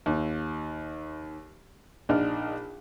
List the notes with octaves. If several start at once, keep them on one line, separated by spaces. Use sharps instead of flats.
D#2
A#1 D4 D#4 F6